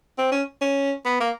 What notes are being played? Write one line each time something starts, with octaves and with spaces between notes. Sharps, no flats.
C4
C#4
C#4
B3
A#3